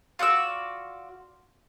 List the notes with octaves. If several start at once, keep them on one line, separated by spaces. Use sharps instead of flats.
F4 F#4 D5 E6